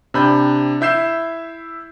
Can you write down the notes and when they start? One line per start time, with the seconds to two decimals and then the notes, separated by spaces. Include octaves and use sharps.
0.14 C3 D4 B5 G6
0.81 E4 E5 G6 C7 E7